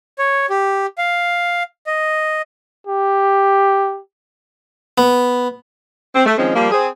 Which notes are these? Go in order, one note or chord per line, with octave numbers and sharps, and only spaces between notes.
C#5
G4
F5
D#5
G4
B3
C4
A3
D#3 F3 G#3 C4 C#4
F3 G3 A#3
C4 G#4